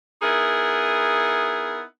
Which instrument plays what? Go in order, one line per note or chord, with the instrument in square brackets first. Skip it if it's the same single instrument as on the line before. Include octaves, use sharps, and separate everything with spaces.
[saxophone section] B3 D#4 E4 G#4 A#4